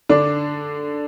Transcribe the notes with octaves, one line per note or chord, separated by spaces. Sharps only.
D3 D4